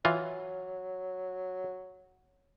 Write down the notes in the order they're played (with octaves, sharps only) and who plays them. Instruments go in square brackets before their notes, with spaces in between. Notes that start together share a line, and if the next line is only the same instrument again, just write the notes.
[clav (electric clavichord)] E3 F4 [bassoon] F#3